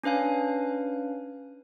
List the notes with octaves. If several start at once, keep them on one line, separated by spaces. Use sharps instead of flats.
C#4 D4 B4 F5 G#5